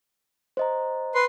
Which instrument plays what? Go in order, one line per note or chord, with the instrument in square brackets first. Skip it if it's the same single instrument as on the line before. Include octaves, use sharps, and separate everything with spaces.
[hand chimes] C5 D#5 A#5
[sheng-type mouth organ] B4 C6